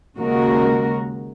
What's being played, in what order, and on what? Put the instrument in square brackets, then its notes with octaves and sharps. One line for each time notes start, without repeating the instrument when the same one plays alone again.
[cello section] D#2 C#3 G#3 F#4 A#4